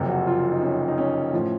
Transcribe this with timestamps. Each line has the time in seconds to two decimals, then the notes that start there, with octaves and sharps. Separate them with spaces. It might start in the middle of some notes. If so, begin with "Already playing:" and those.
Already playing: F#1 F2 C3 F#3
0.09 F#4
0.27 F4
0.52 D#4
0.62 C#4
0.88 D#4
0.98 C#4
1.33 A2 F3